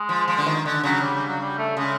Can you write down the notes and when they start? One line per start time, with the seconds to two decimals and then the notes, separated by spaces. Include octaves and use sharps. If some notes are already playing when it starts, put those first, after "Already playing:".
Already playing: G#3
0.09 F3
0.28 F3
0.38 D3
0.46 D#3
0.66 D3
0.83 C#3 F#3
1.02 G3
1.15 G3
1.28 F#3
1.40 G3
1.58 A3
1.77 C#3 G#3